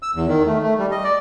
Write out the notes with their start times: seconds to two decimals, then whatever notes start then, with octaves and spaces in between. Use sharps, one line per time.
0.02 E6
0.15 E2
0.28 D#3
0.47 A3
0.63 A3
0.78 G3
0.91 D#5
1.04 D5